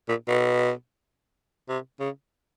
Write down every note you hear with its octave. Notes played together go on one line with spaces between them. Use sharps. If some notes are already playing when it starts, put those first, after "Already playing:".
A#2
B2
C3
C#3